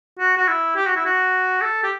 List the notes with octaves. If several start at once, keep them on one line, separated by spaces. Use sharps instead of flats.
F#4
F#4
E4
G4
F#4
E4
F#4
A4
G4